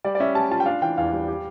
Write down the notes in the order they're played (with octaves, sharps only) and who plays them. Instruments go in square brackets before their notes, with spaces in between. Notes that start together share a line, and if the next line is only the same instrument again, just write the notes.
[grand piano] G3 [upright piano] D5
[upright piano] D5
[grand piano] C#4 [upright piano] E5
[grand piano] G3 [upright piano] A5
[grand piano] F4 [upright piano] A5
[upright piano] G5
[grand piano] D4 [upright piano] F5
[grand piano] E3 [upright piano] G5
[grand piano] E2 [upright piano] F5
[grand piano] G3
G4